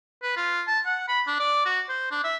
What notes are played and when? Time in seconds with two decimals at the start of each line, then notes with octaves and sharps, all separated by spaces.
0.23 B4
0.37 F4
0.67 A5
0.86 F#5
1.08 B5
1.27 D4
1.40 D5
1.65 F#4
1.89 C5
2.11 D4
2.24 E5